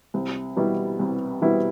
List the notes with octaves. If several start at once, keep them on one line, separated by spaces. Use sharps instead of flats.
C2
B2 G3 B3 E4
C2
B2 G3 B3 E4